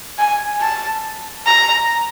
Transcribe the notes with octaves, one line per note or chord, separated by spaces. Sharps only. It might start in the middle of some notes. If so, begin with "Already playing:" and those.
G#5
A5
A#5